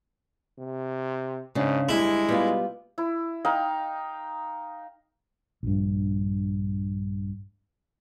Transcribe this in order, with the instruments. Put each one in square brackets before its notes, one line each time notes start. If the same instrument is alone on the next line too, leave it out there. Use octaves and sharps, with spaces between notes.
[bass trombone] C3
[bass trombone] G#2 [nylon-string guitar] C#3 D4
[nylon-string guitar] D2 G3 [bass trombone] G#3 [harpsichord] E4
[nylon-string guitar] G3 B3 F4
[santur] E4
D#4 F5 G5
[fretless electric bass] A#1 G2